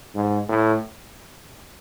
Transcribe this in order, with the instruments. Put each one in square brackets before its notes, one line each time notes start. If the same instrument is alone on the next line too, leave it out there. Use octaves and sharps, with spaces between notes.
[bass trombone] G#2
A2